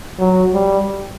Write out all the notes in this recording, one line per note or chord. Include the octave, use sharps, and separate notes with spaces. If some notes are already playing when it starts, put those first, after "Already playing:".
F#3
G3